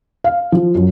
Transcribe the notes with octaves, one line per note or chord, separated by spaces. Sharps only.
F5
F3
F#2